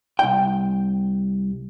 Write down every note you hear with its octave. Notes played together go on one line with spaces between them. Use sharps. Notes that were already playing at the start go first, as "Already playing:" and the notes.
C2 G5